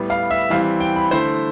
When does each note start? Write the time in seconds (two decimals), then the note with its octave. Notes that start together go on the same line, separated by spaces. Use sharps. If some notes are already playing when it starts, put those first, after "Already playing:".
Already playing: A2 G3 B3
0.10 F5
0.31 E5
0.50 E3 G3 C4 E4 F5
0.80 G5
0.96 B5
1.11 D3 A3 E4 C5